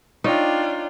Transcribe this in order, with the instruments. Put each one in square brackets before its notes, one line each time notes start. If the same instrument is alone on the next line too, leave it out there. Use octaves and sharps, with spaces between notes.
[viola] D4 F4 [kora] D#4 [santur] C#5 D5 G5